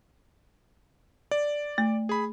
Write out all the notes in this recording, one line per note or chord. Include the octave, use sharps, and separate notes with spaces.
D5
A3
G#4 B5